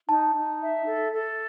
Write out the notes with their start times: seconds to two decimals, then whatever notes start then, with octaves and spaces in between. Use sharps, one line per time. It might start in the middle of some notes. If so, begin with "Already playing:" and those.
0.09 D#4 A5
0.35 D#4
0.61 E5
0.87 A4
1.13 A4